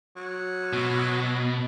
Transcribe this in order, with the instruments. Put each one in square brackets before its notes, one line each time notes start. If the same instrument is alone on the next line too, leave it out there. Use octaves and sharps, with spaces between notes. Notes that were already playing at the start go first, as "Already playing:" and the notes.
[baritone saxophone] F#3
[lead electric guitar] B2